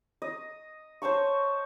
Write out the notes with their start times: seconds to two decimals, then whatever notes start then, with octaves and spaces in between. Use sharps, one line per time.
0.22 D#5
1.02 C5 C#5 A5 C#6